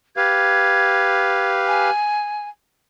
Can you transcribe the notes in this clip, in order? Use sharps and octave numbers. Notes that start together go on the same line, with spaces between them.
G4 B4 F5 G#6
G#5